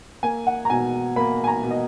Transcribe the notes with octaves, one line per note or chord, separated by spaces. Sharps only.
A#3 G#5
F#5
A#5
B2 G#5
A#3 B5
G#5
A#5
B2
D#5